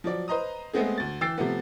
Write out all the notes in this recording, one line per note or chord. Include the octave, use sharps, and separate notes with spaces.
F3 F#3 D5
B4 C5 D#5 A#5 D#6
G#3 A3 B3 C4 G#4
D2 A6
E3 G5 E6 A6 C7
C3 F3 A3 B3